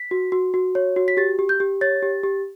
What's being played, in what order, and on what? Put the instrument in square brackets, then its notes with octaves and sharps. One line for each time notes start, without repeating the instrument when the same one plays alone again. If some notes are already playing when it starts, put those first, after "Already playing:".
Already playing: [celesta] B6
F#4
F#4
F#4
C#5
F#4
B6
G4 A6
G4
G6
G4
C#5 A6
G4
G4